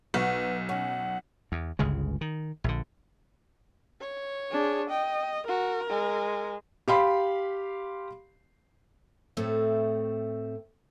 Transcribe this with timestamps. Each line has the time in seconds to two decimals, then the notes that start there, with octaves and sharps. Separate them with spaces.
0.14 B1 F#4 B4
0.69 C#4 F#5
1.52 E2
1.79 G1 C#2 C#3 G#3
2.21 D#3
2.64 A#1 D3
4.00 C#5
4.52 D4 G#4
4.89 D#5 G5
5.48 F#4 A#4
5.89 G#3
6.88 G4 F5 B5 C6
9.37 A2 A3 C4